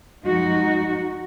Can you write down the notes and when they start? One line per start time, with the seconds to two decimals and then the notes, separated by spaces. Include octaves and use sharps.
0.25 F#2 F3 G#3 D#4 F#4